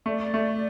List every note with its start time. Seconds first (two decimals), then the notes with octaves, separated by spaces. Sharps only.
0.06 A3 D5
0.34 A3